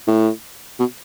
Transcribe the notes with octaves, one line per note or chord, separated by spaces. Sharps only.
A2
B2